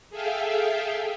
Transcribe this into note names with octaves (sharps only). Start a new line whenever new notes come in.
G#4 A4 E5 F5 G5